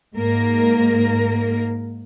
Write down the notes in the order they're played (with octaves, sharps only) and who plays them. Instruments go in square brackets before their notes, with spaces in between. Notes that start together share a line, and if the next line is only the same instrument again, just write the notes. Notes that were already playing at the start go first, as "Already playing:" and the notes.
[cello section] G#2 A#3 A#4